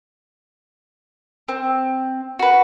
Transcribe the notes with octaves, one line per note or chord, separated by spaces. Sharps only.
C4
F#4 B4